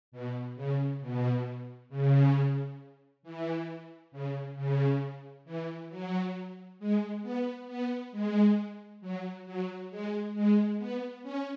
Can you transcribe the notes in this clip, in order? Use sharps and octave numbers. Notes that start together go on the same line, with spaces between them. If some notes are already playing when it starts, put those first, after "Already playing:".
B2
C#3
B2
C#3
E3
C#3
C#3
E3
F#3
G#3
B3
B3
G#3
F#3
F#3
G#3
G#3
B3
C#4